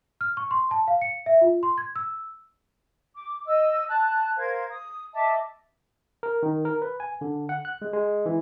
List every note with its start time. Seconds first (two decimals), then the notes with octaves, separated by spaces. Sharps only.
0.21 F6
0.37 C#6
0.51 C6
0.71 A5
0.88 F5
1.02 C#7
1.26 E5
1.41 F4
1.63 C6
1.78 G#6
1.96 E6
3.14 D6
3.46 D#5 E6
3.88 A5 F#6
4.37 A#4 C5 F5 G#6
4.70 D#6
5.14 D#5 E5 A5 D6
6.23 A#4
6.43 D#3
6.65 A#4
6.82 B4
7.00 G#5
7.21 D3
7.49 F#5
7.65 F#6
7.82 G#3
7.93 G#3
8.26 E3